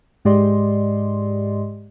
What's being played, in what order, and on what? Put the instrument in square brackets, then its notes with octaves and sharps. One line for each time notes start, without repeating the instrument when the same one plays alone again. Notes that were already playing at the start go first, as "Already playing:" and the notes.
[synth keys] G#2 G#3 G4 D5 D#5 C6